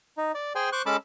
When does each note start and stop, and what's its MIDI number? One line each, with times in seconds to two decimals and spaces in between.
0.17 0.32 63
0.34 0.53 74
0.55 0.70 68
0.55 0.70 72
0.55 0.70 79
0.55 0.70 80
0.72 0.82 72
0.72 0.82 85
0.72 0.82 86
0.72 0.82 90
0.86 0.97 56
0.86 0.97 61
0.86 0.97 69
0.86 0.97 81
0.86 0.97 83
0.86 0.97 86